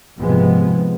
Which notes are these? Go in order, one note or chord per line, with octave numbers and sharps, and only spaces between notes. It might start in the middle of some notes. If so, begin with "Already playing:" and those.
D#2 G#2 C3 F3 G#3 B3